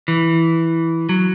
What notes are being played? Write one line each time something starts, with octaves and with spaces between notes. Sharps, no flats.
E3
F#3